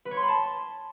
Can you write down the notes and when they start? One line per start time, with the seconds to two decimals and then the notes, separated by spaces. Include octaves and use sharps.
0.05 B4
0.11 C#5
0.17 C6
0.22 B5
0.28 A5